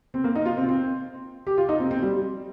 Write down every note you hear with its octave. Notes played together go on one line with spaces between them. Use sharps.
C4
A#3
D#4
F4
C4
C4
G4
F4
D#4
C4
C4
G3